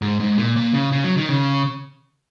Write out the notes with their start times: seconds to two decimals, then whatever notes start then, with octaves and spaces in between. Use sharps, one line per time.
0.02 G#2
0.20 G#2
0.38 A#2
0.56 A#2
0.74 C#3
0.92 C#3
1.04 F#3
1.17 D#3
1.29 C#3